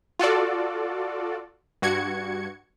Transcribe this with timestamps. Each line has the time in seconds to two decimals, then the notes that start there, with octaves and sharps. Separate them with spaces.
0.19 F4 F#4 A4 D5
1.82 G2 F#4 G#6 C#7